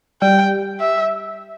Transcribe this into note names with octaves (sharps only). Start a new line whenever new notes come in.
G3 G5
E5